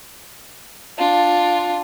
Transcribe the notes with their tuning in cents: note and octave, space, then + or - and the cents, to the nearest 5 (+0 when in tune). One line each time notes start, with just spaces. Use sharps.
D4 +0 F4 +10